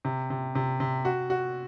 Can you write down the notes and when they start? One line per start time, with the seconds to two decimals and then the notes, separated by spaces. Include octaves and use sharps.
0.05 C3
0.30 C3
0.55 C3
0.80 C3
1.05 F#4
1.30 F#4